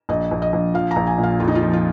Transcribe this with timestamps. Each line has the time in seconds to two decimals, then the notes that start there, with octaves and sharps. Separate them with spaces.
0.09 A#1 D#5
0.31 A#1
0.42 D#5
0.53 A#1
0.74 F3 F5
0.91 A#5
0.96 A#1
1.07 G#5
1.18 A#2
1.23 F5
1.40 F2 F4
1.48 D#4
1.55 F4
1.62 F3
1.73 F4